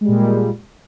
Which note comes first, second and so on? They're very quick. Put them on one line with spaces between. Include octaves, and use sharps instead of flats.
G#3 G3 A#2